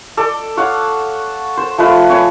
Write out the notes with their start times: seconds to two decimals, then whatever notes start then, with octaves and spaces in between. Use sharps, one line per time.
0.17 A4 D5
0.57 C#5 F5 F#5
1.57 C5
1.78 F3 A3 B4
2.10 B4 C#5 F5 G#5